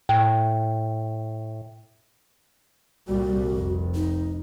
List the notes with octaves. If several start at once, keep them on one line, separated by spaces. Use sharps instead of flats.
A2 G5
C2 A#2 G3 F#4
F1
D#4